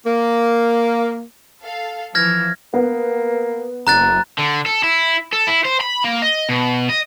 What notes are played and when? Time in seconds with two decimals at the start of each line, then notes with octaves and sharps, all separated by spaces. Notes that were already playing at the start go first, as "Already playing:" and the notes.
0.05 A#3
1.63 A4 F5
2.15 E3 F3 F6 G#6 A#6
2.74 A#3 B3
3.87 F#1 A#5 F#6 A6
4.38 D3
4.66 A4
4.84 E4
5.33 A4
5.47 E4
5.65 C5
5.81 B5
6.04 A#3
6.22 D#5
6.49 B2
6.89 D#5